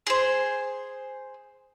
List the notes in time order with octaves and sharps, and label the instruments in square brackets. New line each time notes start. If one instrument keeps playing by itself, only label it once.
[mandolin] G#4 C5